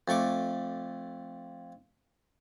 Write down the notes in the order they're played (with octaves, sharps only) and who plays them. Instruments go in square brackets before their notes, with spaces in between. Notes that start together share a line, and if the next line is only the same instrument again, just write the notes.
[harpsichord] F2 A3 C#6 D6